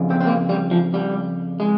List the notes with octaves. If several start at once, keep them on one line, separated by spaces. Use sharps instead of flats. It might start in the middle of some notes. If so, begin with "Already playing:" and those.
Already playing: F2 C#3
C4
C4
A#3
G3
F3
G3
G#3